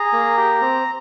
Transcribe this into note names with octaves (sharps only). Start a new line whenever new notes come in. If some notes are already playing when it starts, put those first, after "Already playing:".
Already playing: G#4 A#5
A#3
G4
C4